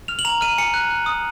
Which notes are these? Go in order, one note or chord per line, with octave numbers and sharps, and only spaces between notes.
F6 F7
F#7
A#5 F7
F6 D#7
G#5 C#7
F#6
F#6
D#6